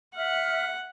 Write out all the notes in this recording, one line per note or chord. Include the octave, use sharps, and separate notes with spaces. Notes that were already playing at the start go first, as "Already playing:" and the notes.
E5 F#5 F6